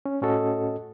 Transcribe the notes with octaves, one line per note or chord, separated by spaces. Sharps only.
C#4
A2 C#4 F#4 A4 D#5